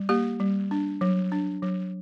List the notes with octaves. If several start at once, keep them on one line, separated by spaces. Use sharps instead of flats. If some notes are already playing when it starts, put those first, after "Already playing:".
Already playing: G3
A#3 G4
G3
D4
F#3
D4
F#3